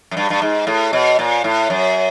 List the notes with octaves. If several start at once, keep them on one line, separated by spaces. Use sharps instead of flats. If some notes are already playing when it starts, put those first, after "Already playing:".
F#2
G2
G2
G#2
A2
B2
A#2
A2
F#2